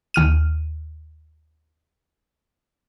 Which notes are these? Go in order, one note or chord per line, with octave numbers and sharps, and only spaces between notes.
D#2 F6 D#7